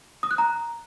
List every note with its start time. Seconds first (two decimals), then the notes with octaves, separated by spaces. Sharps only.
0.23 D#6
0.31 F#6
0.38 A#5